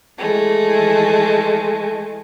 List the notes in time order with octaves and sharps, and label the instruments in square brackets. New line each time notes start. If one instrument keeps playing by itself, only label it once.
[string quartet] E3 G#3 A3